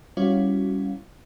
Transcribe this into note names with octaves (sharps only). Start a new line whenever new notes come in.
G3 C#4 E4 F#4 C#5 F5